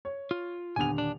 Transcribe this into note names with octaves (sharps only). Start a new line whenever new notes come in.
C#5
F4
D#1 D3 B3 G#5 F7
D4